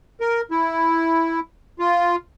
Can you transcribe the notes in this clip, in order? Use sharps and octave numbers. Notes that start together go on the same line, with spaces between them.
A#4
E4
F4